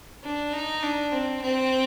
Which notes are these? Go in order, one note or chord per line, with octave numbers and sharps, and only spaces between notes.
D4
D#4
D4
C4
C4